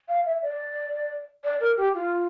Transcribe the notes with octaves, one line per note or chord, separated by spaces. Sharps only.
F5
E5
D5
D5
A#4
G4
F4